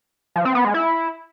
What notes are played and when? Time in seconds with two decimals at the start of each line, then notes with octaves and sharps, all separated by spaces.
0.36 F3
0.45 C4
0.55 B3
0.65 G#3
0.74 E4